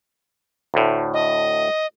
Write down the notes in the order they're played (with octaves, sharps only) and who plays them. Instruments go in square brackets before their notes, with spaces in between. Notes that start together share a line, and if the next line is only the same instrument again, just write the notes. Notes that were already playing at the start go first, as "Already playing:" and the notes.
[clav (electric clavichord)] D2 A2
[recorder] D#5